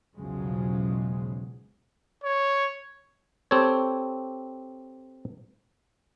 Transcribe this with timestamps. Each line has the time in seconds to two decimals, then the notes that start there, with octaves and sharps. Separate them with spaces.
0.16 B1 E2 C#3 F3 F#3 G#3
2.24 C#5
3.51 C4 G4 A4 C#5